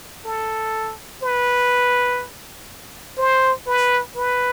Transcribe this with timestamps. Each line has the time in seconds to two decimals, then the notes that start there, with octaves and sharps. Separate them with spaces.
0.25 A4
1.23 B4
3.18 C5
3.67 B4
4.16 B4